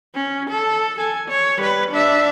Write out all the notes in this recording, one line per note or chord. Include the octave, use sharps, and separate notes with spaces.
C#4
A4
A4 G#5
C#5
G3 B4
D4 E5